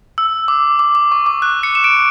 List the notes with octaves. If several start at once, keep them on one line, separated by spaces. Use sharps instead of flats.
E6
D6
D6
D6
C#6
D6
F#6
C#7
E7
D7